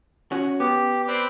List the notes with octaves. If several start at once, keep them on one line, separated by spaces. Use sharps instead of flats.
C#4 F#4
B3 G4
C4 B4 D5